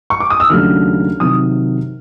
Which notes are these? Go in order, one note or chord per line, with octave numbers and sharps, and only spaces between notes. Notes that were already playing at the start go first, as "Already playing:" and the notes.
C#6
D6
D#6
E6
D#2 C#3 F#3 A3 D4 F6
C3 D#3 F#3 D#6